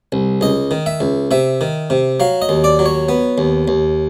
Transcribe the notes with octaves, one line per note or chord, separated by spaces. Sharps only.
C2
C#2 D#5
D#3
E5
C#2
C3 E5
D#3
C3
F#3 F5
D#5
D#2
D5
F#3
C#5
B3
D#2
D#2